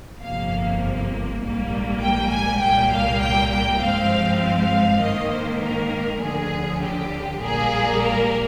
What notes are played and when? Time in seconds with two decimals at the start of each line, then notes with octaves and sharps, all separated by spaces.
0.21 G1 F2 C3 F3 A#3 F5
1.42 A#1 G#2 G3 A#3
2.02 G5
2.31 G#5
2.61 C2 A#2 G3 A#3 G5
2.92 F5
3.22 G5
3.52 G5
3.81 G2 F3 G#3 C4 F5
4.42 F5
5.02 G#2 D#3 A#3 D#5
5.31 C5
5.61 A#4
6.22 D2 D3 F3 G#4
6.82 G4
7.42 A#1 A#2 G3 A#3 G#4
8.02 A#4